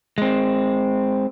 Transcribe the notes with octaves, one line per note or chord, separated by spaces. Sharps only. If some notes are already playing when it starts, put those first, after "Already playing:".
G#3 C4